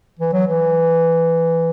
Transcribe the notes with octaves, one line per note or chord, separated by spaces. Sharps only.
E3
F#3
E3